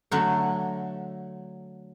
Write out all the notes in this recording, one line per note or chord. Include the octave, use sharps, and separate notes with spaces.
D3 F#3 A3